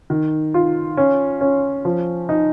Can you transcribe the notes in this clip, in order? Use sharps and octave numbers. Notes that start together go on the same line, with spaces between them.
D#3
F4
C#4
C#4
F3
D#4